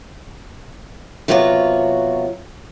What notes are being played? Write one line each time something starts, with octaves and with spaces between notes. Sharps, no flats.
C3 F#3 B3 F4 F#4 C#5